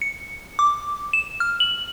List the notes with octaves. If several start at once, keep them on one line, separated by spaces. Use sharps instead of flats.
C#7
D6
E7
F6
F#7